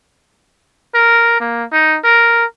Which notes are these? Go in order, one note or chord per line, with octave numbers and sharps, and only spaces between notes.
A#4
A#3
D#4
A#4